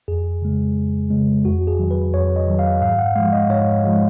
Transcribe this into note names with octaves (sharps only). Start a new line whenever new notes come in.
F2 G#4
C#3 G#3
F2
C#3 G#3
F2 F#4
G#4
D#3 F#3
B4
F2 C#5
D#5
D#3 F#3
F5
G#2 F5
F#5
F3 G#3 F5
D#5
G#2 C#5
F3 G#3